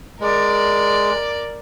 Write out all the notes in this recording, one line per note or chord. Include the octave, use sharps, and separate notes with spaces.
G#3 A#4 D5